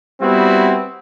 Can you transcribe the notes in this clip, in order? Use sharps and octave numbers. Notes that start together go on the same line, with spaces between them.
G3 B3 C4 E4 F#4